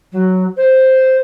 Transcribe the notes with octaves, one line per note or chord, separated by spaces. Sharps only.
F#3
C5